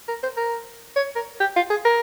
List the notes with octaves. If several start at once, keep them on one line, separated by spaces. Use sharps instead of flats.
A#4
C5
A#4
C#5
A#4
G4
F4
G#4
A#4